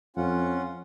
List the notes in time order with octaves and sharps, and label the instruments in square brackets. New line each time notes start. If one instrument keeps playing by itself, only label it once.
[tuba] F2 [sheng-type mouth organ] C#4 F4 F#5